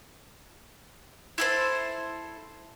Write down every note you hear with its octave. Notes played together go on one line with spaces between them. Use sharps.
E4 A4 C5